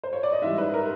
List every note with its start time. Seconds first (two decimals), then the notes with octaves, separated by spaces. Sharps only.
0.04 C5
0.13 C#5
0.23 D5
0.32 D#5
0.42 G#2 E3 G3 E5
0.58 B4
0.74 A#4